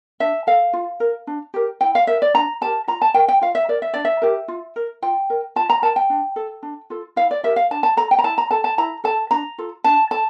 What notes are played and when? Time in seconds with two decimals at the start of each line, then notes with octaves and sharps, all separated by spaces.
0.20 D4 E5
0.47 A4 F5
0.73 F4
1.00 A#4
1.27 D4
1.54 G4 A#4
1.81 E4 G5
1.95 F5
2.07 A#4 E5
2.22 D5
2.34 D4 A#5
2.61 G4 A#4 A5
2.88 F4 A#5
3.02 A5
3.14 A#4 G5
3.28 G5
3.41 F4 F5
3.55 E5
3.69 A#4 D5
3.82 E5
3.94 D4 D5
4.05 E5
4.22 G4 A#4
4.48 F4
4.76 A#4
5.02 F4 G5
5.30 A#4
5.56 F4 A5
5.70 A#5
5.82 A#4 A5
5.96 G5
6.10 D4
6.36 A4
6.63 D4
6.90 F4 A4
7.16 E4 F5
7.31 D5
7.43 G4 A#4 E5
7.56 F5
7.71 D4 A5
7.83 A5
7.97 A4 A#5
8.11 G5
8.18 A#5
8.24 E4 A5
8.38 A#5
8.51 A4 A5
8.64 A5
8.78 E4 A#5
9.04 A4 A5
9.31 D4 A#5
9.58 F4 A4
9.84 D4 A5
10.11 A4 A5